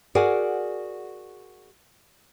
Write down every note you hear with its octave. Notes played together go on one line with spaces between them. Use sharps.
F#4 G#4 A#4 D5 F#5 G#5